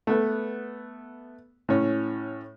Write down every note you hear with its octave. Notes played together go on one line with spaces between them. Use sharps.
A3 B3
A2 C#4